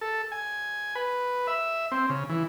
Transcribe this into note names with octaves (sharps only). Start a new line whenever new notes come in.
A4
G#5
B4
E5
C4
C#3
E3